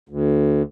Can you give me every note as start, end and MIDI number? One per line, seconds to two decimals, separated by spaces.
0.09 0.62 38